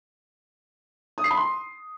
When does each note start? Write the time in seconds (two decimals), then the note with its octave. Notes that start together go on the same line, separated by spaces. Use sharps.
1.18 D#6
1.24 C7
1.30 B5
1.37 C6